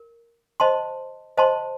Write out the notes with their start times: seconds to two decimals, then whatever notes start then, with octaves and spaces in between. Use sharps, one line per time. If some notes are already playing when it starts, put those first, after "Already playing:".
Already playing: A#4
0.60 C5 D#5 A5 C6
1.37 C5 D#5 A5 C6